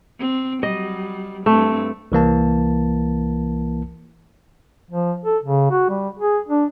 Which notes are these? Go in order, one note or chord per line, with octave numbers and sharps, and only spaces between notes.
C4
F#3 G3 D#5
G2 A3 C4
C2 E3 A#3 A5
F3
A4
C#3
F#4
G3
G#4
D4